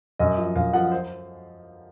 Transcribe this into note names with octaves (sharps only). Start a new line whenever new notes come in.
F#2 D#5
F3
F#2 F5
F3 F#5
C5